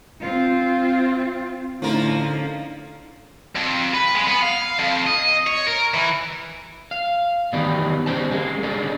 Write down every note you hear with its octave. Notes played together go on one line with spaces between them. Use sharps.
C4 F4
A2 D3 F3 A#3 C#4 D#4 A#4 A#5
F2
B4
G#3
B3
F5
F2
D#5
C#5
A#4
E3
F5
E2 D#3 B3 D#4 G4 D5
C#4 G4 C5 A5
G#3 A#3
C#4 D4 G#4 A4